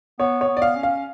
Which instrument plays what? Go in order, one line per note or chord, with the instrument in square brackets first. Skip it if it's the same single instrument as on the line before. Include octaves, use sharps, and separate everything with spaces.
[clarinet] B3 [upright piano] C#5
[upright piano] C#5
[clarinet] B3
[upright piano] D5
F5
[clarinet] C#4
[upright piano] F5